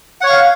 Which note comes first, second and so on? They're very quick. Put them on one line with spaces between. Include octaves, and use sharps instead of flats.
F#5 C#5 C#6 F5